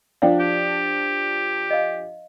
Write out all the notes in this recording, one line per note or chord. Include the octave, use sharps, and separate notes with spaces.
F3 D4 F5 G5
G4
D#5 F5